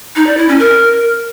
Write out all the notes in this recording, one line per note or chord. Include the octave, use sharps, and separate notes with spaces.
D#4
D5
E4
C#4
A#4